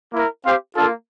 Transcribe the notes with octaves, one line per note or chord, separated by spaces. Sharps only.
A#3 E4 A#4
C4 G4 C5 F5
A#3 D4 F4 A4